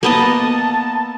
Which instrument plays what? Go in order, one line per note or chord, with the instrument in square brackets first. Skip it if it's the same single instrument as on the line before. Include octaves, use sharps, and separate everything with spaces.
[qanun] A#3 B3 D#5 [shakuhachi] A5